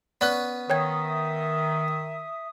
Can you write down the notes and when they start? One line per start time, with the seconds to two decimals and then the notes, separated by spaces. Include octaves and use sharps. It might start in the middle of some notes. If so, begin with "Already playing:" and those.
0.21 B3 C#4 D5 C#6 F#6
0.70 D#3 C#5 E5 G5 D#6 G#6